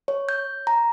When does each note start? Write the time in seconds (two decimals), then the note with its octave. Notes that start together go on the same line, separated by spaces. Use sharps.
0.08 C#5
0.29 G6
0.67 A#5